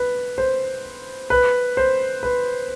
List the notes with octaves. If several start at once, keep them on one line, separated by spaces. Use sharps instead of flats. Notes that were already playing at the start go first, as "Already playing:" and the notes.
Already playing: B4
C5
B4
C5
B4